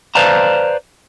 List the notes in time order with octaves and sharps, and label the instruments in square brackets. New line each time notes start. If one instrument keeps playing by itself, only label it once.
[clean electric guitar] B4 C5 D5 F5 A5 A#5